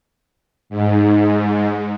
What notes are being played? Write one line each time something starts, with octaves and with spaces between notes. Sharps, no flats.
G#2